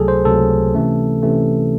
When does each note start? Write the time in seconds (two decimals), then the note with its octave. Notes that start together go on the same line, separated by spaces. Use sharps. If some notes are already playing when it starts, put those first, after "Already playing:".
Already playing: C#2 C3 F#3 A3 G#4 A4
0.08 C5
0.25 C#2 C3 F#3 A3 A4
0.74 C3 E3 A3 C#4
1.23 C3 E3 A3 C#4